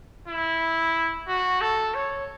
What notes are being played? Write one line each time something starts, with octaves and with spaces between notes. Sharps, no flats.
E4
F#4
A4
C#5